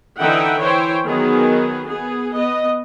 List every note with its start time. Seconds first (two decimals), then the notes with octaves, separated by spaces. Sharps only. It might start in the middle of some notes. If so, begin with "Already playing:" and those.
0.18 D3 E3 D#4 E5 F#5 G5
0.61 E3 E4 C5 C#5 G5
1.07 D#3 F#3 B3 G#4
1.89 B3 G#4
2.36 B3 D#5